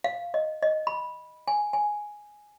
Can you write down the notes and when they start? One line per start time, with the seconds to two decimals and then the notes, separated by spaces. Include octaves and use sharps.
0.04 F5
0.34 D#5
0.62 D#5
0.87 B5
1.48 G#5
1.73 G#5